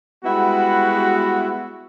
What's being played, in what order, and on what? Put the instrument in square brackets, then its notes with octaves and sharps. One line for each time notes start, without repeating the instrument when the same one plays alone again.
[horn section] G3 G#3 B3 E4 F#4